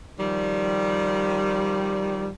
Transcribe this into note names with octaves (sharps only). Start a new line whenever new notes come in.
D#3 F3 G3